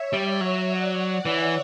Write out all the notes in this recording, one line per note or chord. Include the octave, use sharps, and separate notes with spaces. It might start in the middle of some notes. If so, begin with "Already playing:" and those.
Already playing: C#5 E5
G3
F#3
D5 F#5
E3 C#5 E5